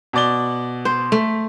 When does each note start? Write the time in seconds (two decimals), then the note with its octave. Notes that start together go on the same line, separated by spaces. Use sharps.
0.13 B2 D5 G7
0.85 C5
1.12 A3